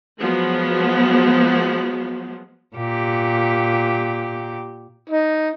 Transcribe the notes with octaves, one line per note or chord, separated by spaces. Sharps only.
F3 F#3 G#3 B3
A#2 G4
D#4